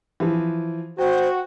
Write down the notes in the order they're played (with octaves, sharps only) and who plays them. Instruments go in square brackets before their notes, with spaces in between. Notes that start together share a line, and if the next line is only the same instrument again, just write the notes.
[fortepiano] E3 F3
[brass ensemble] F#4 [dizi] C5 [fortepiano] G5